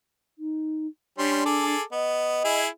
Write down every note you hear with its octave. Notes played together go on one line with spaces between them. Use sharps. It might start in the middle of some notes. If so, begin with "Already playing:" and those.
D#4
G3 C#4 D4 C6
G#4 A4 D6
B3 D#5
E4 G#4